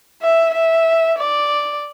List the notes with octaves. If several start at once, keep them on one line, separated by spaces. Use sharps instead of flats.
E5
E5
D5